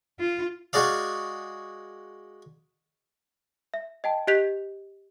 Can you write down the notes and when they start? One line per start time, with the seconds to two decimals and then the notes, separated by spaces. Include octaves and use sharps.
0.20 F4
0.73 G#3 F#4 G#4 D5 F5
3.74 E5
4.04 D#5 G5 A5
4.27 G4 D#5 F#6 G6 B6 F7